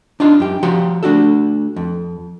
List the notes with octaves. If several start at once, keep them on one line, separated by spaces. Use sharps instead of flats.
D4 D#4 F4 C6
F#2 G4
F3 F#4 G4 F5 C6
A3 D4 F#4 A4
F2